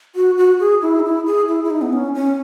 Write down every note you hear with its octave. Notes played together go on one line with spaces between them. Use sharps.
F#4
F#4
G#4
E4
D#4
E4
G#4
E4
E4
D#4
B3
C#4
C#4